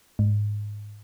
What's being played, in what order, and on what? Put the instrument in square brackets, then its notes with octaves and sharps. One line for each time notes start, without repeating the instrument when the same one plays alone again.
[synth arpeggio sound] G#2